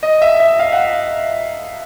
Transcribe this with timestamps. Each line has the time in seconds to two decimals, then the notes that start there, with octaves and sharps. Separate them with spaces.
0.03 D#5
0.22 E5
0.40 E5
0.59 F5
0.72 F#5